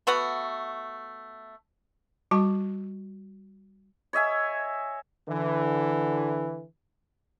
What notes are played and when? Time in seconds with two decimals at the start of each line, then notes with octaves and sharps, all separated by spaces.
0.07 A3 B3 F#4 F#5
2.31 G3 F#4 A5 C#6
4.13 C#5 D#5 E5 G#5
5.28 D3 E3